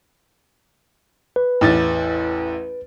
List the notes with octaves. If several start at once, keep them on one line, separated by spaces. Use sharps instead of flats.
B4
A1 E2 A6